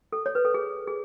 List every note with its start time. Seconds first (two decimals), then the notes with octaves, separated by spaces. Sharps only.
0.12 A4
0.26 C#5
0.35 B4
0.45 A4
0.54 G#4
0.87 G#4